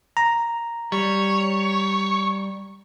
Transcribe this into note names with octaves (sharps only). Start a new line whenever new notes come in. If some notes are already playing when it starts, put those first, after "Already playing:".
A#5
G3 C#5